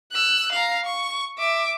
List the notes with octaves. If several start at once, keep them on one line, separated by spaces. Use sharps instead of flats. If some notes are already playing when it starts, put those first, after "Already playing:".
E6 F#6
F5 A#5
C#6
E5 D6